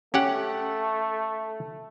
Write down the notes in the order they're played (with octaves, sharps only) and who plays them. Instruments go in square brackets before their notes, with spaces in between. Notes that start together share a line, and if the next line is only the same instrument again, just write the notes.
[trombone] A3 [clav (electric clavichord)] C#4 G4 F#5